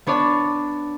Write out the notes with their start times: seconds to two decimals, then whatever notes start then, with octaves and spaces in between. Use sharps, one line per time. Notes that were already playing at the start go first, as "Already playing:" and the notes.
0.06 B3 D4 C#5 D5